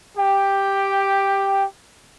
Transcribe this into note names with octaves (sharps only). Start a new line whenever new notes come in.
G4 G5